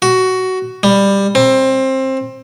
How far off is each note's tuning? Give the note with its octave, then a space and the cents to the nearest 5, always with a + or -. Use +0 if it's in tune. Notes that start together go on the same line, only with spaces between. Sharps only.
F#4 +15
G3 +15
C4 +20